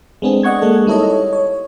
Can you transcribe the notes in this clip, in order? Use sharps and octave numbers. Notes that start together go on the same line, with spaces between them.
G#3 A3 B3 C4 D4 G#4
D5 D#5 F#5 C#6 G#6
G#3 A#3 G#4 A4
G3 D#4 E4 A4 C#5 D#5
C#5
C#5